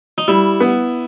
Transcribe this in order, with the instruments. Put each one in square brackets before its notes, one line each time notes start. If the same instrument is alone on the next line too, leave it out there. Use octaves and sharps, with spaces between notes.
[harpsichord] D#4
[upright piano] G3 [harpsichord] E4
[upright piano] B3